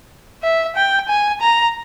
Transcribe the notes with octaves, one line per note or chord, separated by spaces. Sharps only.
E5
G5
G#5
A#5